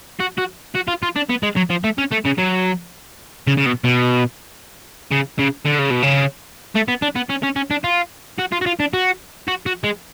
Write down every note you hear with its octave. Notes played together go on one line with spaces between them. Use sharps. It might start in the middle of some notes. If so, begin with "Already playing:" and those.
F#4
F#4
F#4
F4
F4
D4
B3
G#3
F#3
F3
A3
C#4
A3
C#3
F#3
C#3
C#3
B2
B2
C#3
C#3
D3
C#3
B2
C#3
A3
B3
D4
B3
C#4
C#4
C#4
D4
F4
F#4
F4
F#4
F4
D4
F#4
F#4
F#4
G#3